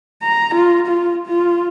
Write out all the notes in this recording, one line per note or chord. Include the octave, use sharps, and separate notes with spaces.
A#5
F4
F4
F4